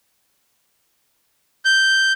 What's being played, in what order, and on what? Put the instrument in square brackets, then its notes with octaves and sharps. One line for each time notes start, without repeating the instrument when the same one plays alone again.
[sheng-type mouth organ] G6